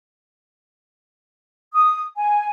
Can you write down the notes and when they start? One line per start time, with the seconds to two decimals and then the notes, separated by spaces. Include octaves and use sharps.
1.73 D#6
2.16 G#5